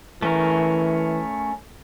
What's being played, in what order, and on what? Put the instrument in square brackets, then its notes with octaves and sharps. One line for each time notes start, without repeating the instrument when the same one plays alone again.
[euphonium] E3 [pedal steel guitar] A3 C#4 A#4